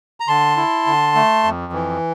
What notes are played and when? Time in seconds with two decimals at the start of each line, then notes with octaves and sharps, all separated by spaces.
0.20 A#5
0.28 D3 A5 C6
0.57 E4
0.87 D3
1.15 A3
1.44 F2
1.73 E3